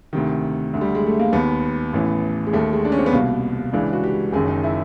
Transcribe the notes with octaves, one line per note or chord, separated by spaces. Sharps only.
D2 C3 D#3
D2 D3
G3
G#3
A3
A#3
D#2 D#3 B3
A1 A2 E3
G#3
D#2 D#3 A3
G#3
D4
C#4
C4
B3
C2 B2 A#3
C#2 C#3 E3 D4
F#4
G4
F#1 F#2 D#3 G#4
D#4
E4